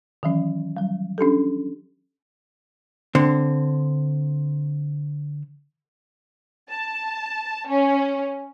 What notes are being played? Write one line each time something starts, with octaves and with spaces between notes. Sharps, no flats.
D#3 E3 F#3 C#4
F#3 G3
C#4 D4 G4 A4
D3 C4
A5
C#4